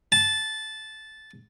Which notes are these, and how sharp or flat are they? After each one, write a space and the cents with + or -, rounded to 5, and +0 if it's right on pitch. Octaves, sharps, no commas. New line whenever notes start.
A5 -10